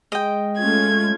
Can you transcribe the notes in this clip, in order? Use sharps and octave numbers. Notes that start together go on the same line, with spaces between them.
G#3 D#5 G5
A3 C#4 F4 G#6